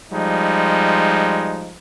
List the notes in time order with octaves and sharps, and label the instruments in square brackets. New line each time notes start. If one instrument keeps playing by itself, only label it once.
[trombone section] F3 G3 G#3 D#4